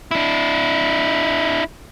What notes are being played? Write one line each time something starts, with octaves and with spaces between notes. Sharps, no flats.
D4 E4